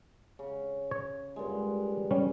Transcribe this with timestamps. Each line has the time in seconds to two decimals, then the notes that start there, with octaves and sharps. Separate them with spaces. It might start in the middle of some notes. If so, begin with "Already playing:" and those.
0.39 C#3
0.91 C#5
1.36 G2 A#2 G#3
2.11 G3 C#4